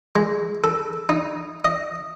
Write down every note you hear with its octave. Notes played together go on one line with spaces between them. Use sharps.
G#3
A4
D#4
D#5